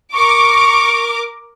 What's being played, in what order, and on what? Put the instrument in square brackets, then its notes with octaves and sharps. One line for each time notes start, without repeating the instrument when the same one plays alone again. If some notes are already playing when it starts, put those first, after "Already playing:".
[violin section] A#4 D6 [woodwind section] C#6